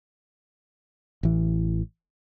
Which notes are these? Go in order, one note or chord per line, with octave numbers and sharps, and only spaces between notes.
A1 E3